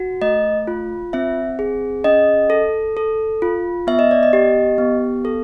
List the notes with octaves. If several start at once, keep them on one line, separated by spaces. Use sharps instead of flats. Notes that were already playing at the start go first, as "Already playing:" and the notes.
Already playing: F#4
A3 D#5
F4
C4 E5
G#4
C#4 D#5
A4
A4
F4
B3 E5
D#5
D5
D#5
G4
B3
A4